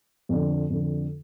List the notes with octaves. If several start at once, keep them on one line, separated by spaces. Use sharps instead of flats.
F2 D3
F2 D3